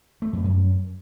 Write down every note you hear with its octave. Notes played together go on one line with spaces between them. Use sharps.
A3
F2
F#2